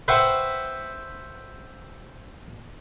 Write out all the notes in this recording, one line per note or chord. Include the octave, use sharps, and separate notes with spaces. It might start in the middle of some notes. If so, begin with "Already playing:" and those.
B4 C5 E5 F#5 G5 C#6